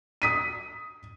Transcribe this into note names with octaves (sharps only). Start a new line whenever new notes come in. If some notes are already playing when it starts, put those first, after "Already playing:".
D#6 B6 D#7